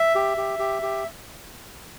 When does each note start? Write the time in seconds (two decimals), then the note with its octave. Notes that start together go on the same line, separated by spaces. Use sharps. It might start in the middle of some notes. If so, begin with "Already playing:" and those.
Already playing: E5
0.15 G4
0.37 G4
0.59 G4
0.82 G4